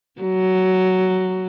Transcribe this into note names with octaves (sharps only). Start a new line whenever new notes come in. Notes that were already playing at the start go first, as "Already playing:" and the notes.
F#3